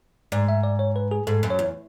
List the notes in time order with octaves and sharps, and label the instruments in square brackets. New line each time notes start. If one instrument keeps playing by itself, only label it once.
[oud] G#2 [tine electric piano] D5
[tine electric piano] E5
D5
C#5
B4
G#4
[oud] G#2 [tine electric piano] A4
[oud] F#2
[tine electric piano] C#5
[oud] E2